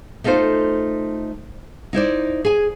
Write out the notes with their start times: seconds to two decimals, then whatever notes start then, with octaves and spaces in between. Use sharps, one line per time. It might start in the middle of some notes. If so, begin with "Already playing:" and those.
0.24 A3 D#4 F4 A4 C5
1.93 D#4 E4 C5 D5
2.45 G#4 G#5